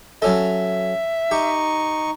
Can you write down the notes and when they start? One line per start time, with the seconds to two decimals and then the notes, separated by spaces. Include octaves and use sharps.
0.22 F#3 C#4 A4 E5
1.31 D#4 G4 C#6